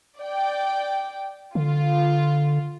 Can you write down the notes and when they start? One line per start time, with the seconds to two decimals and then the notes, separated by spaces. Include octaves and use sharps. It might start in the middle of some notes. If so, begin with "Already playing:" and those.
0.18 D5 G5
1.55 D3 F4